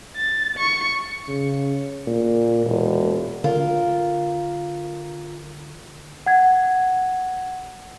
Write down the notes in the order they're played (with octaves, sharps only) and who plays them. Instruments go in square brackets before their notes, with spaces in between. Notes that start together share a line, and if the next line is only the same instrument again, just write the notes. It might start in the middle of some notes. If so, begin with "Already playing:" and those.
[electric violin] A6
C#6
[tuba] C#3
A#2
E1
[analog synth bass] D3 [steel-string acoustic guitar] F4 A#4
[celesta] F#5 G#6